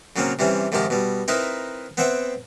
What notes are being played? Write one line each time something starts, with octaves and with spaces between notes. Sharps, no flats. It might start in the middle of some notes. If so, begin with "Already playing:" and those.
C#3 F#3 A#3 C4 C#4
C3 E3 G3 C4 C#4
G#2 C3 D#3 F3 G4
B2 G3
C4 D#4 E4 A#4 B4 D#5
B3 C4 C5 E5 F#5 G5